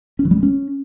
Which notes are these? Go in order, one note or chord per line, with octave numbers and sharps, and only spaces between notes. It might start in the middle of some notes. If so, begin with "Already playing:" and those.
C#4
E3
G3
G#3
C#4